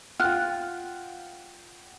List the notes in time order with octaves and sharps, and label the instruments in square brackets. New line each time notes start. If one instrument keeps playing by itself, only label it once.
[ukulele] F4 [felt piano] F#5 G5 [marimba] F6 F#6